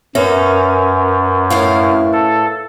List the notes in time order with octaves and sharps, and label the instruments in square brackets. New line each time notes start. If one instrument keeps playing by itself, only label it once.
[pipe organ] F#2 [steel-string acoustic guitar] C#4 [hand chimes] A#4 B4 E5
[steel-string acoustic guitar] A2 E4 F5
[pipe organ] A4